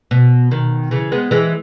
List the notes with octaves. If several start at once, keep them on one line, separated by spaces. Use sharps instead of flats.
B2
B2 D#3
C#3 E3
G#3 B3
E3 G#3